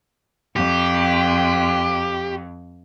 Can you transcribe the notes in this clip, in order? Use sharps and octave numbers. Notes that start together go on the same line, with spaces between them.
F2 G4